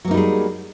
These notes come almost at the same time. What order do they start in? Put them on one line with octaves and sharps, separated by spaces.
F#3 A#3 D#4 G3 G#4